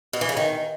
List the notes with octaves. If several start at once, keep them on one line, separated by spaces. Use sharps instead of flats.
B2
E3
C#3
D#3